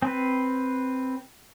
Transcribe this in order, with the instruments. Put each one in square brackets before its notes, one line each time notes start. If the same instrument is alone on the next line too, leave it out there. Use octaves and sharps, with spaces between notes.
[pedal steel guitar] C4 B4